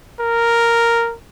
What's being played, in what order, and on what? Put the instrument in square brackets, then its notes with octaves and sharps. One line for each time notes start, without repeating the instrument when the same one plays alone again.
[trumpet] A#4